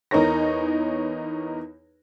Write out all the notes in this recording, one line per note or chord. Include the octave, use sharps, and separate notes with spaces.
E2 D#4 A#4 C#5 A#6